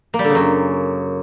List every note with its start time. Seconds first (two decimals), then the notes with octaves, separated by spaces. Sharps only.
0.14 A#3
0.19 G3
0.24 D3
0.30 C#3
0.35 F#2